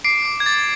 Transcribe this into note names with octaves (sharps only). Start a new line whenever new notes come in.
D6 C7 D7
D6
G#6
D6 A6